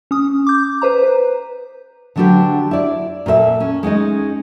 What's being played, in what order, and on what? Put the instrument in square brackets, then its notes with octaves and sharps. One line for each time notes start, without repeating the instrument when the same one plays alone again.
[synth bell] C#4 D#6
D6 G6
B4 C5 A#5
B4
[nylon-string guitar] D3 F#3 D4 F#4 G4 B4
E4 D5
A#2 A4 B4 E5
C#4
G#3 C#4 D#4 D#5